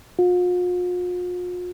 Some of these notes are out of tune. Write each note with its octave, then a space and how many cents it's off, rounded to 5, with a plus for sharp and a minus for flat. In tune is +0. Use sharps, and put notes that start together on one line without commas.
F4 +40